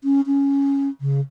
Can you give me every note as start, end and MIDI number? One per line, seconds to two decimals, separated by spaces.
0.04 0.21 61
0.27 0.89 61
1.01 1.20 49